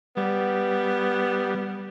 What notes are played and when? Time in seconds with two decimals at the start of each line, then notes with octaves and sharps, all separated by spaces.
0.17 G3 B3